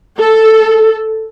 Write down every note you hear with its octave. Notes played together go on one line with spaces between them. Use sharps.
A4